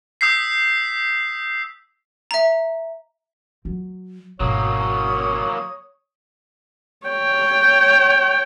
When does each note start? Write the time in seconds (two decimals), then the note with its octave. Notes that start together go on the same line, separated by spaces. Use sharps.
0.21 D#6 E6 G6 B6 C7
2.31 E5 A#5
3.65 F#3
4.40 G#1 B2 F#3 A#3 C#5 D#6
7.07 C#5 G5